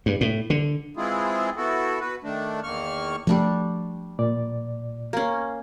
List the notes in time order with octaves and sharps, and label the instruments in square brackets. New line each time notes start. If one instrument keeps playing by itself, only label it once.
[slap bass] G2
A2
D3
[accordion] E3 G#3 C4 E4 F4 G#4
B3 E4 F#4 A4
F#4 B4
D#3 A3 D4
E2 D#3 A#3 C#6 F6
[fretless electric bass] F3 A3 [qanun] G3 D4 C#6
[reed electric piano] A#2 D5
[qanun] A#3 C#4